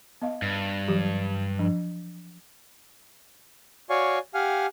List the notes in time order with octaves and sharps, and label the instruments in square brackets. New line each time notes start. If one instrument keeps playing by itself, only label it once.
[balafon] B3 D#5 F5
[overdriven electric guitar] G2
[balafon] E3 F#3 G4
F3 D4
[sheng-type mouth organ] F#4 C#5 D5 F5 G#5 C#6
G4 F5 F#5 G#5 F6